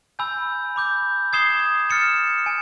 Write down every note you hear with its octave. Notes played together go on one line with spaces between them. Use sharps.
G#5 B5 E6 G6
B5 D6 G6
D#6 G#6 C7 E7 G7
F6 A6 C#7 E7
G#5